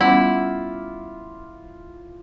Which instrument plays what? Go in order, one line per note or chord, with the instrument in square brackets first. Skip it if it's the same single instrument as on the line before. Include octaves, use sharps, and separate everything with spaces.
[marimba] G3 B3 C#4 [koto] E4 [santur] F4 D6 [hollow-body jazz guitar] F#5